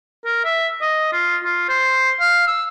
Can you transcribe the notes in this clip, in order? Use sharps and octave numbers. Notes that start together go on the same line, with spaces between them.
A#4
E5
D#5
F4
F4
C5
F5
E6